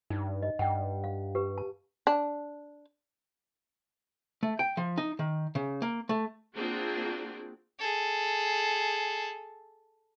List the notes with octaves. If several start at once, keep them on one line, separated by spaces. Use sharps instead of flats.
G2 D#4
D#5
G2 F#5 G5
F5
G4 B4
A5
D4
A3
G5
F3
D#4
D#3
C#3
A#3
A3
A#3 C4 D4 F4 F#4 G#4
G#4 A4